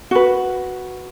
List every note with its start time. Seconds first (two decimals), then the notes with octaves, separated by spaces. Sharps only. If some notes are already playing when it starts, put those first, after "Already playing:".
0.11 F#4 B4